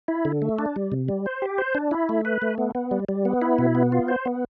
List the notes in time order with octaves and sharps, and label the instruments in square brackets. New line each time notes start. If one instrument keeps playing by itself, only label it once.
[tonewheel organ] E4
D3
A3
D4
G3
C3
G3
C5
G4
C5
D4
E4
A3
B4
A3
B3
B3
G3
G3
B3
E4
B2
B3
F4
C5
B3